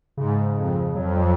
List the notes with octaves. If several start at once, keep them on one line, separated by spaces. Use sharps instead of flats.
G#2 C#3
F2
F2 F#3
F#3